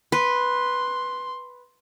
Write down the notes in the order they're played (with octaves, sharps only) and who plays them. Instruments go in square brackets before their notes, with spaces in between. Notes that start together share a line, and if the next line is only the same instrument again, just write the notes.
[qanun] B4 [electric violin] C6